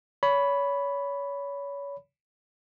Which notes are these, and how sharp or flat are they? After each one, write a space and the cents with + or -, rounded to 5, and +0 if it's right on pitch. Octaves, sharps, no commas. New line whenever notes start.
C#5 +30 B5 +0